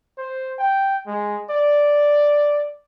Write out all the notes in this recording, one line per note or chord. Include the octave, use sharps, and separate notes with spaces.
C5
G5
G#3
D5